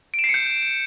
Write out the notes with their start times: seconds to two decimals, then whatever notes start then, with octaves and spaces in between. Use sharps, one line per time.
0.14 D7
0.19 E7
0.24 C7
0.29 C#7
0.34 G6